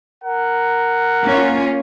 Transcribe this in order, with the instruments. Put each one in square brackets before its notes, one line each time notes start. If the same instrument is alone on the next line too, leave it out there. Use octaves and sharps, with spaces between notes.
[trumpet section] A#4 F#5
[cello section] A#3 C#4 F4